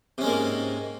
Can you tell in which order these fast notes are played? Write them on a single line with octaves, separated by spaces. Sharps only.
C3 C#4 G#3 A#3 G#2